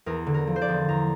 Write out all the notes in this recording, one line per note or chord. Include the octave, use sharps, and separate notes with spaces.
E2 A#4
D3
A#4
F3
C5
D5
E2
E2 A#5